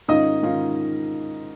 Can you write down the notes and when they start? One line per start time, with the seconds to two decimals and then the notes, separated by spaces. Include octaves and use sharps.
0.08 G#2 D#3 C#4 F4 D#5 D#6
0.43 G#2 D#3 C#4 F4